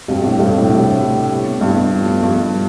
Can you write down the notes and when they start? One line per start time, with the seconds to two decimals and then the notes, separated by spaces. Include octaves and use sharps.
0.08 G2 B2 A3 C4 G4
0.23 A2
0.39 G2 A3 C4 G4
0.54 A2
0.69 A2 C3 G3 D4 G4
1.00 G3 D4 G4
1.31 G3 B3 E4
1.61 G2 G3 B3 E4
1.91 F3 B3 F4 A4
2.22 G2 F3 B3 F4 A4
2.53 A3